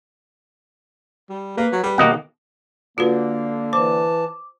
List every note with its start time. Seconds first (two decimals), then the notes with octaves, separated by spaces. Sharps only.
1.30 G3
1.57 A#3 B4
1.72 F#3
1.83 G3 B4
1.98 B2 D#3 A#3 D#5 F#5
2.98 D3 A#3 F4 F#4 B4
3.73 E3 C5 A5 D6